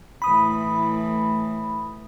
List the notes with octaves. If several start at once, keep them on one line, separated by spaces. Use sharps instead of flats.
A2 E3 B5 D#6